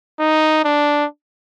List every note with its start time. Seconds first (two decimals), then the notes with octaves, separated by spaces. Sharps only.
0.20 D#4
0.65 D4